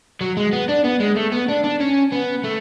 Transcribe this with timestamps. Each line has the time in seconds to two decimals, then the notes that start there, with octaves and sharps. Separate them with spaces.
0.21 F#3
0.37 G#3
0.53 B3
0.69 D4
0.85 B3
1.00 G#3
1.16 A3
1.32 B3
1.49 D4
1.64 D4
1.80 C#4
2.12 B3
2.44 A3